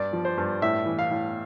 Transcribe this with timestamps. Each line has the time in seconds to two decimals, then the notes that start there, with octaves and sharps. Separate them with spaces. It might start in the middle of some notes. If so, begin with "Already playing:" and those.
Already playing: G2 D5
0.13 F3
0.25 C5
0.38 G2
0.62 A2 E5
0.86 E3
0.99 F5
1.11 A2